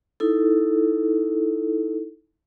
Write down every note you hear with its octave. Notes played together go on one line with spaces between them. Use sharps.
D#4 E4 A4